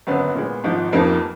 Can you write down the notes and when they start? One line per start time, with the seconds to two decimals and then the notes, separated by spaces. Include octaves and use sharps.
0.07 G#1 F#2 D3 F#3 B3
0.35 A#2 G#3 B3
0.64 G#1 G#2 F3
0.92 F1 F2 F3 A#3 D#4